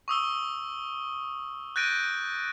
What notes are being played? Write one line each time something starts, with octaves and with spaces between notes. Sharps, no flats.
C#6 D#6 E6 G7
F#6 G6 A6 A#6 D7 D#7